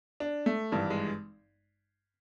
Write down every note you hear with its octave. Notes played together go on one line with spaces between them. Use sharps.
D4
A3
G#1 G2 E3 G3
G#3